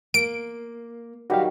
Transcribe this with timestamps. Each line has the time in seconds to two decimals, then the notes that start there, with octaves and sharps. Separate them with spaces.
0.14 A#3 D7
1.30 D#3 F#3 G3 F#4 G4 F5